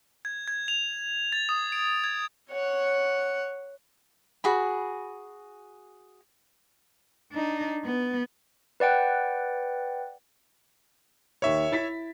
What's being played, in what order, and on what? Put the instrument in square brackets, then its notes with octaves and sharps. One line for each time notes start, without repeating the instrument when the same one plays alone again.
[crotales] G#6
G#6
F7
A6
D#6
D7
G#6
[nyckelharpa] C#5 F#5
[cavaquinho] F#4 G#4 B5
[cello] D4 D#4
B3
[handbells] B4 D5 F#5 G5
[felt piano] D#2 C#6 [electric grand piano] C#5 E5
[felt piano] E4 A6 B6